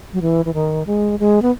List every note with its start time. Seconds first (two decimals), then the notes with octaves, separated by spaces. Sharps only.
0.13 F#3
0.22 E3
0.45 E3
0.54 D#3
0.87 G#3
1.20 G#3
1.42 B3